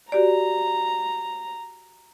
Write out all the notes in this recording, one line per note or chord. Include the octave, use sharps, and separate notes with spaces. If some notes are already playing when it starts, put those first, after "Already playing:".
F#4 G4 D5 A#5